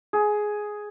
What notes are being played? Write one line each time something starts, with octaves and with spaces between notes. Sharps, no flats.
G#4